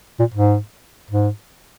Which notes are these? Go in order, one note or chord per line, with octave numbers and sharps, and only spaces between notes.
A#2
G#2
G#2